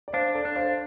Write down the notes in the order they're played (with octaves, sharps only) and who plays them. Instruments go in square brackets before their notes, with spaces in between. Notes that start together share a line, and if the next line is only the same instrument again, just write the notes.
[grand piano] D5
[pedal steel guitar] D4 [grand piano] C5 F5
[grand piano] A4 D5
[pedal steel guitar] D4
[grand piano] C5 F5